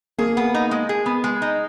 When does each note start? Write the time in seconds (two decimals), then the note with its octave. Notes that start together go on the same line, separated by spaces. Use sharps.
0.18 A#3 G#4
0.37 B3
0.54 D#4
0.71 G#3
0.89 G#4
1.06 B3
1.24 G#3
1.42 D#4